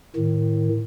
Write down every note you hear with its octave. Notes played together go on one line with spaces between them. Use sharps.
A2 D#3